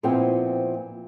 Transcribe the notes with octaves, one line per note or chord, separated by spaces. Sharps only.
A#2 F3 B3 C4 E4 G5